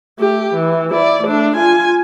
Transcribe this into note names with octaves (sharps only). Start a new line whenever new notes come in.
A3 G4
E3
E4 D5
A3 D4
F4 G#5